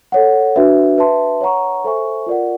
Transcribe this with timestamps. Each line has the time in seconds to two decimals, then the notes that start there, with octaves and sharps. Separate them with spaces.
0.12 A4 C#5 F#5
0.56 D4 F#4 B4 E5
0.98 B4 E5 A5 C6
1.41 C#5 F#5 A#5 C#6
1.84 A4 C5 E5 G#5 C#6
2.26 F4 A#4 D5 F#5